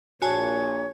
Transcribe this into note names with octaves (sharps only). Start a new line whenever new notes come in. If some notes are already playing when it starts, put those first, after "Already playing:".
A#1 A#2 F#4 C#5 G#5 A5